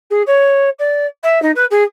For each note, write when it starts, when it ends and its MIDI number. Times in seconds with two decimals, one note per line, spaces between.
0.10 0.22 68
0.26 0.69 73
0.79 1.05 74
1.23 1.41 76
1.42 1.51 63
1.55 1.65 71
1.70 1.83 68